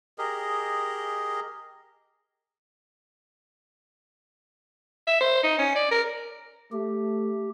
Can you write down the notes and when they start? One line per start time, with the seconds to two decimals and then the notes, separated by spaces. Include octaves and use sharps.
0.18 G4 G#4 A#4 D#5
5.07 E5
5.20 C5
5.43 D#4
5.58 C#4
5.75 D5
5.91 A#4
6.72 A3 G4